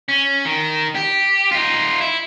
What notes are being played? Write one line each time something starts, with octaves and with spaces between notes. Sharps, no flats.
C#4
D#3
G4
D#4 F4
E4